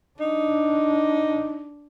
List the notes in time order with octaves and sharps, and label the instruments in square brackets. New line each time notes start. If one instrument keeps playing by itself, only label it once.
[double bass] D4 [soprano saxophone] D#4